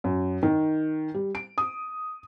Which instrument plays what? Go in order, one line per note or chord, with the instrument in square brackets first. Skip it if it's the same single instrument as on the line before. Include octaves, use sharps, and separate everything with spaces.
[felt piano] F#2
D#3
G3
D7
D#6